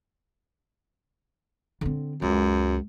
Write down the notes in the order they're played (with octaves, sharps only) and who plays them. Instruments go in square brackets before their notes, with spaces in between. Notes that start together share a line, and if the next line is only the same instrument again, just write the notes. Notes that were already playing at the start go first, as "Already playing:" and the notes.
[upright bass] D3 C4
[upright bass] C#2 [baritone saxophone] F#2